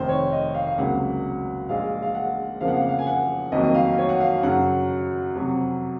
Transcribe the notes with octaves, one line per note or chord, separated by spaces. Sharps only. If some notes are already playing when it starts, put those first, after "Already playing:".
Already playing: F1 F2 D#3 C5
C#5
D#5
F5
F5
C#2 C3 F#3 A#3 F#5
A#1 A#2 G#3 F5
F5
F#5
F2 C#3 F3 A#3 F5
F#5
F5
F#5
F5
G#5
F#5
F2 D#3 F#3 A#3 D#5
D#5
F5
C#5
F#5
F5
F#2 C#3 F#3 F#5
F2 C3 F#3